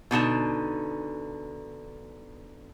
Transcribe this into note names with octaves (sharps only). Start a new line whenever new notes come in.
B2 D3 D#4 A5